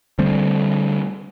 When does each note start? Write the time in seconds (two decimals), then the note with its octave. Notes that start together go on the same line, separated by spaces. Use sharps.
0.19 D3 G3 A3 C4